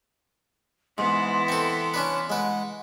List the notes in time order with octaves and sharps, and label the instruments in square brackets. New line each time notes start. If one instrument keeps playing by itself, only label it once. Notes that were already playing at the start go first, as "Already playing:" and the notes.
[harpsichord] G#2 [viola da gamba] E3 B3 E4 [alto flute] C6
[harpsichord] C4 A4
C#4 D4 B4
[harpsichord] G#3 B4 [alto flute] F#5